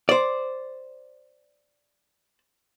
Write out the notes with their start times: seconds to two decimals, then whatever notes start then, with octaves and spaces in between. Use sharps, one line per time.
0.09 C5 D5